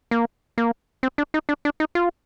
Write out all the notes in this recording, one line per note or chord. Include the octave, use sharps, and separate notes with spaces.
A#3
A#3
C4
D4
D#4
D4
D4
D#4
F4